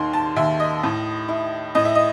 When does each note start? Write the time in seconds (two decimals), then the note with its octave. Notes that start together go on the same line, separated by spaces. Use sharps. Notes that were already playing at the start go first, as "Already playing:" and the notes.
Already playing: D#2 D#3 C6
0.13 A5
0.36 D#2 E5
0.60 D#5
0.83 A2
1.28 E4
1.75 A2 D#5
1.85 E5
1.95 D#5